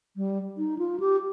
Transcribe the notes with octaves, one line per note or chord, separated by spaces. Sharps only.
G3
D#4
F4
G4